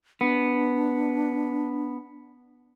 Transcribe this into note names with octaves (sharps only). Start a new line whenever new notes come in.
B3 D4